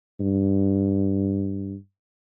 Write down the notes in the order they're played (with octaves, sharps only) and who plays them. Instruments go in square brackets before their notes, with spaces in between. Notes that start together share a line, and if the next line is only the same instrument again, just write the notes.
[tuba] G2